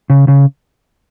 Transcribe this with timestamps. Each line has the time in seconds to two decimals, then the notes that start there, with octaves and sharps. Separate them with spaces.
0.10 C#3
0.28 C#3